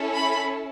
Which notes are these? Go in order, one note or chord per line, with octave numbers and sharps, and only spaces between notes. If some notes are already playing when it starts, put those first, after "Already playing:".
Already playing: C#4 E4 A4
B5